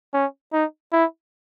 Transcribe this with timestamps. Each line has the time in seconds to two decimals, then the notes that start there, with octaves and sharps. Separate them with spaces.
0.14 C#4
0.53 D#4
0.92 E4